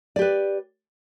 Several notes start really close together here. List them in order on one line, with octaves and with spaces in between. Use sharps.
D5 G4 B4